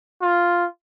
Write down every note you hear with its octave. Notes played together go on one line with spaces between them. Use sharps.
F4